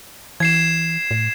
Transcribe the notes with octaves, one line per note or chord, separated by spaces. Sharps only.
E3 G#6 C7 E7
A2